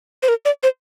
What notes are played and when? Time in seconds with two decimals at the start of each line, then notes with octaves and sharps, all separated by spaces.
0.23 C5
0.28 A#4
0.45 D5
0.63 C5